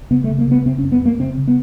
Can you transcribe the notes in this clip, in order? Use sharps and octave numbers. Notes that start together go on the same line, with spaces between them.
C#3 B3
A3
C#3
A#3
C#3 B3
C#3 C4
C#4
F#2
B3
F#2 A#3
C#3 C4
C#3
B3